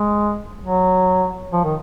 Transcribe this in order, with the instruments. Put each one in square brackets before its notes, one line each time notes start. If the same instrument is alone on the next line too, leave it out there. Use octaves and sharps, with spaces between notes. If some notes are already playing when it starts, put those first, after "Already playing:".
Already playing: [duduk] G#3
F#3
F3
D#3